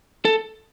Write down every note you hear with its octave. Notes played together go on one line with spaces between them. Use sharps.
A4